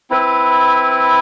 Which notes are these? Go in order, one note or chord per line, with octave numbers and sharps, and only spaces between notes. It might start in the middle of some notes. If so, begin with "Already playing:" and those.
C4 E4 B4